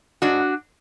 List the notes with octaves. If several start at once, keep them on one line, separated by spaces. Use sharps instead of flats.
G#2 D4 F#4